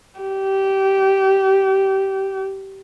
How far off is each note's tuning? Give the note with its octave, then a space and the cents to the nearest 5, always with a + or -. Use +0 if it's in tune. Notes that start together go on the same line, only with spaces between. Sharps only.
G4 -20